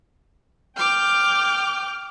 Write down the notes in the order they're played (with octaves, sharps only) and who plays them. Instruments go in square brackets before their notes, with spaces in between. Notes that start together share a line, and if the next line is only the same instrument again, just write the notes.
[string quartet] G5 D6 F6 G6